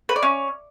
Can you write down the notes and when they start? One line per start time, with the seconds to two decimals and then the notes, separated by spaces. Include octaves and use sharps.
0.09 B4
0.16 D5
0.23 C#4